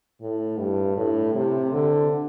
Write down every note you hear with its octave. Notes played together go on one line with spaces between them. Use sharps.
A2
G2
A2
C3
D3